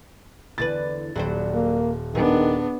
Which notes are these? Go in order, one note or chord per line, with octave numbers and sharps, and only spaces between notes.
E2 D3 B4 A6
D#1 F#3 G3 C5
A#3
D#3 B3 D4 G#4